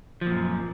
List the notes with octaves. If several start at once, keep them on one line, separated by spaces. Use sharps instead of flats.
F#2 A#2 F3